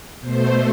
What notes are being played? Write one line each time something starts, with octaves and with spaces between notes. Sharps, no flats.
B2 A3 C5